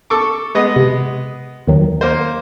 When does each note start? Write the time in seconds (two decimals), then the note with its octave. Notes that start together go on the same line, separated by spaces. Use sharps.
0.10 A4 C#6 D6
0.55 G#3 B3 D#5
0.76 C3
1.67 D#2 D#3 F#3
2.01 A#3 C5